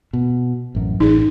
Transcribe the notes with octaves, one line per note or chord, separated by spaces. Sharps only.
B2
A1 F#2
A1 D#4 G#4